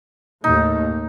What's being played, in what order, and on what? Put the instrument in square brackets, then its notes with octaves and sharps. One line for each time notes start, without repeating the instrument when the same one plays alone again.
[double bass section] D#2 A2 [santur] D#4